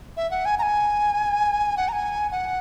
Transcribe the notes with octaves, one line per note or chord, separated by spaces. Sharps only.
E5
F#5
G#5
A#5
G#5
F#5
A#5
G#5
F#5